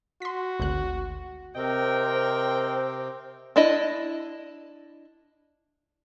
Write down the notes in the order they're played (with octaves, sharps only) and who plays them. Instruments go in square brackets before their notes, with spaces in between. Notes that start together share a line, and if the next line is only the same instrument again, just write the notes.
[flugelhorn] F#4 [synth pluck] C6 B6
[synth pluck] G#1 D2 F#6
[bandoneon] C3 C4 [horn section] A#4 D#5 G5 [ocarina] C5
[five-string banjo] D4 E4 D#5